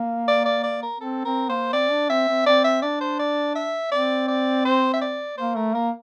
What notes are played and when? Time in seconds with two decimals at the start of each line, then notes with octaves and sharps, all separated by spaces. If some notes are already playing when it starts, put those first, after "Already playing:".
Already playing: A#3
0.28 D5
0.45 D5
0.63 D5
0.83 A#4
1.00 C4 A4
1.25 C4 A#4
1.49 A#3 C5
1.73 C4 D5
1.91 D4
2.09 C4 E5
2.29 C4
2.46 C4 D5
2.64 E5
2.82 D4 D5
3.01 C5
3.19 D5
3.55 E5
3.92 C4 D5
4.28 D5
4.65 C5
4.94 E5
5.01 D5
5.38 A#3 C5
5.56 A3 A#4
5.74 A#3 A#4